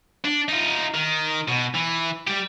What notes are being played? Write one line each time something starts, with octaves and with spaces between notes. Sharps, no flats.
D4
D#4 F4
D#3
B2
E3
G3 G4